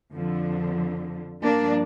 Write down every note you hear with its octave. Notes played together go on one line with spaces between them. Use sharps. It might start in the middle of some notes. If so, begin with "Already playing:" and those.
F2 D3 F3
G2 F3 A#3 D4